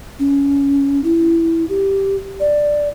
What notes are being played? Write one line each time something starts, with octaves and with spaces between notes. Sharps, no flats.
C#4
E4
G4
D5